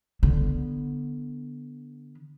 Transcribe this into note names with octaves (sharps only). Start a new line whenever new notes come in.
D3 B3